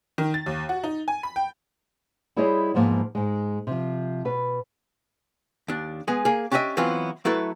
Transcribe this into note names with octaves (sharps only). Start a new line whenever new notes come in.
D#3
A6
D#2
F#4
D#4
G#5
B5
G5
G3 E4 G#4 C5 C#5 D#5
E2 G#2 F3 A#3 B3
G#2 G#3
C3 F3
B2 B4
D#2 D4
G#3 B3 G#4
A#3 G#4
C#4 D4 G4 C#5 D#5 E5
E3 F#3 B3 C4 E4 F4
F#3 A3 E4 A4 B4